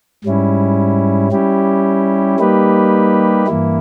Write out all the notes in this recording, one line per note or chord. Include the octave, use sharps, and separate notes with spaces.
G#2 G3 C#4 E4
G3 C#4 E4 G4
G3 A#3 D#4 G4 B4
G2 E3 A#3 E4